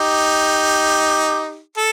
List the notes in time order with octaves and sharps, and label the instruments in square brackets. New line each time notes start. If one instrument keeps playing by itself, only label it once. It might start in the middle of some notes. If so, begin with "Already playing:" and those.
Already playing: [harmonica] D#4 G4
A4